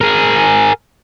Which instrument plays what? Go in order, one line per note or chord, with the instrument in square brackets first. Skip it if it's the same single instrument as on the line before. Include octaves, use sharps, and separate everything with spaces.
[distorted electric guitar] G#4 A#4